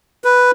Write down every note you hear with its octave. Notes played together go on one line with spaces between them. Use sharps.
B4